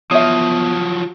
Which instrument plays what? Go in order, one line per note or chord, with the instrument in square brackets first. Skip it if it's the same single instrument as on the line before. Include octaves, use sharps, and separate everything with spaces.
[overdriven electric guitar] F3 F#3 [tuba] B3 [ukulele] C#5 E5 [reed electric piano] D#6